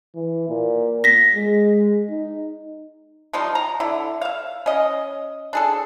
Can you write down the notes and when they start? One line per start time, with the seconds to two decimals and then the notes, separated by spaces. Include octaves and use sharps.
0.15 E3
0.49 A#2
1.04 A#6 B6
1.35 G#3
2.10 D#4
3.33 F3 G3 D#4 F4
3.55 A#5
3.80 D3 E4
4.21 E5 F5
4.66 C#4 D#5
5.53 D4 G#4 A4